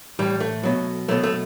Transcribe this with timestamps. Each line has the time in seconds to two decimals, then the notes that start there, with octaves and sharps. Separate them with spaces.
0.19 A2 E3 G3
0.40 A3
0.63 B2 F#3
1.08 B2 F#3 A3
1.23 A3